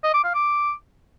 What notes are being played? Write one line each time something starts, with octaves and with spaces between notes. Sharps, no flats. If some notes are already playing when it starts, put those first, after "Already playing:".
D#5
D6
F5
D6